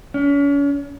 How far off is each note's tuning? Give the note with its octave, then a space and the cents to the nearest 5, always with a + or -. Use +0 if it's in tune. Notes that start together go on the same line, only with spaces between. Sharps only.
C#4 +40